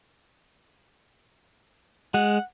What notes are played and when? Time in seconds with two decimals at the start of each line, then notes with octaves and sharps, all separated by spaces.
2.14 G#3 F#5